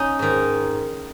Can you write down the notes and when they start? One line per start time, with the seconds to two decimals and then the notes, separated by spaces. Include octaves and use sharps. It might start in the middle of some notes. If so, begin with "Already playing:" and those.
Already playing: C#4 D#4
0.19 G#2 D#3